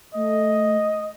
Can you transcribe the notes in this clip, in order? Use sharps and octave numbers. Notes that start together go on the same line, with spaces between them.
A3 D#5